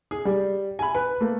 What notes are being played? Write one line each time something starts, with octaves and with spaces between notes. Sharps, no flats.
G#4
G3
G#5 B5
B4
A3 A#3